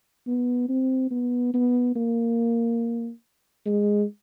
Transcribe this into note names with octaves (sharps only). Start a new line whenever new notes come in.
B3
C4
B3
B3
A#3
G#3